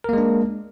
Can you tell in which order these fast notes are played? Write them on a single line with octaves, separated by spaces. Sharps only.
A#4 A#3 G#3 D4